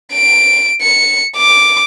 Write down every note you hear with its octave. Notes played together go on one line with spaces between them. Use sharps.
D7
C#7
D6